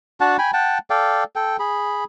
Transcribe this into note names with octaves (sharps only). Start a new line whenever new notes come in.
D4 F#4 F#5 A5
G5 G#5 B5
F#5 G5 A5
A4 D5 F5 G5
A4 G5
G#4 B5